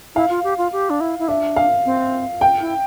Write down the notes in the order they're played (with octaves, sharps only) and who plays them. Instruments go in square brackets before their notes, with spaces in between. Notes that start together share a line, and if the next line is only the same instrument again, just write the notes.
[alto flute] E4 [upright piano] F5
[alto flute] F4
G4
F4
G4
D4
E4
E4
[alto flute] D4 [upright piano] E5
[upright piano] F5
[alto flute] C4
[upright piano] G5
[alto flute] E4